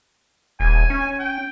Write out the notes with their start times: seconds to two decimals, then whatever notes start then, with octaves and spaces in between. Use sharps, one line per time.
0.60 D#1 G#5
0.90 C#4
1.19 G5